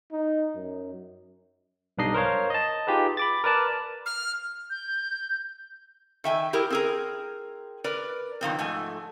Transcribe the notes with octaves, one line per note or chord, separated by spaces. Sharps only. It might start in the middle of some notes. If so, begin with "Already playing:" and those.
D#4
F#2
B1 G2 D4 D#4 D#5 C7
A#4 C5 C#5 F5
D#5 A5
D#4 F4 G4 G#4 B4
B5 D6 A6
A#4 B4 D5 A5
F6
G6
D#3 E5 G5 G#5
E4 G4 G#4 A#4
C4 G#4 A#4
A#4 B4 D5
B2 D#3 F3 C4
G#2 F3 A3 G#5